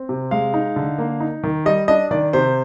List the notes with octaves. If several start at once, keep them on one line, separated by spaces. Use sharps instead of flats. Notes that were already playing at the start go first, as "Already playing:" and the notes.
Already playing: C4
C3
G#3 F5
D#4
D3
A#3
D#4
D#3
G3 D#5
D4 D#5
D#3 D5
C3 C5